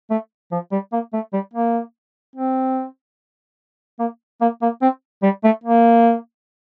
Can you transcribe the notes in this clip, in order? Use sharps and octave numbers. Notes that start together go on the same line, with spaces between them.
A3
F3
G3
A#3
A3
G3
A#3
C4
A#3
A#3
A#3
C4
G3
A3
A#3